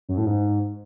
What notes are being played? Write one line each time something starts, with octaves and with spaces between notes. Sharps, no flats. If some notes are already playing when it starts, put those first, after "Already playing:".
F#2
A2
G#2